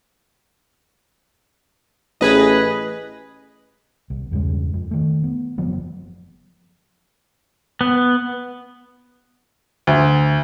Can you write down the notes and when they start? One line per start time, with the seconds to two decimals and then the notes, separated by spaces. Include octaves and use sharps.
2.21 A1 G#4 B4 D#5
4.10 C2
4.31 E2 G2 C#3 G#3
4.74 F2
4.91 D#3 A3
5.24 B3
5.58 F#1 F3 F#3 B3
7.81 B3
9.87 D2